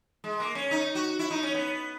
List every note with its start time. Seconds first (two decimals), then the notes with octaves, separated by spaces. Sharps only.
0.24 G#3
0.40 A#3
0.55 C#4
0.71 D#4
0.95 F#4
1.19 E4
1.31 D#4
1.43 C#4
1.54 B3